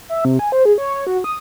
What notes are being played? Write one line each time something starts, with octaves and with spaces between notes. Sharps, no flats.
E5
C3
G#5
C5
G#4
C#5
C#5
F#4
D#6